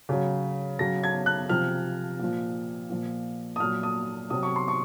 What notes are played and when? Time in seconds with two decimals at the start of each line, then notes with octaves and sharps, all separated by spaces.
0.09 C#3 F#3
0.79 C#3 F#3 A#6
1.04 G#6
1.26 F#6
1.49 C3 F3 F6
2.19 A#2 F3
2.90 A#2 F3
3.56 D#6
3.60 A#2 F#3 F6
3.83 D#6
4.30 C3 F#3 D#6
4.43 C#6
4.56 C6
4.68 C#6